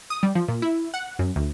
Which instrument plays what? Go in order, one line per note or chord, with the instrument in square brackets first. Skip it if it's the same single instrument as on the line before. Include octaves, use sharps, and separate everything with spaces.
[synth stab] D#6
G3
F3
A#2
E4
F#5
F#2
D2